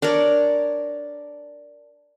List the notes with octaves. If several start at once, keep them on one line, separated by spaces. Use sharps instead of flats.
D4 A#4 C#5 D5